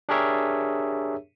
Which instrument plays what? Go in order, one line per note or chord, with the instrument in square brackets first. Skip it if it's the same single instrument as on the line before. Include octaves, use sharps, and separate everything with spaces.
[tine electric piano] D4 G4 G#4 A#4 C#5 E5